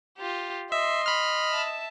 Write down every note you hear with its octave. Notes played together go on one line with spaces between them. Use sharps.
F4 G4
D#5 E5 C6
B5 F6
E5 A5